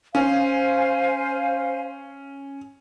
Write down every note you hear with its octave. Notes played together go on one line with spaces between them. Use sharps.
C#4 C5 F5 G#5